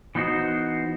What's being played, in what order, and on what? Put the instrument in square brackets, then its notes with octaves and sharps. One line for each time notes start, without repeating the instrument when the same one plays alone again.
[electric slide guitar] E3 B3 D#4 F#4 C5